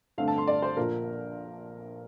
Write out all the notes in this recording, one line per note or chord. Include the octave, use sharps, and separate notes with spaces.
G2 D3 A3 C4 F5
A5
C6
D5
C5
A#1 A#2 F3 A#4